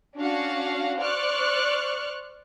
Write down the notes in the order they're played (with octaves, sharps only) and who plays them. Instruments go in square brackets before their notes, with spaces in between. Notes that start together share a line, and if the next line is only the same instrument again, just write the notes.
[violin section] C#4 D4 F#4 F5 F#5
C5 D5 C#6 F6 F#6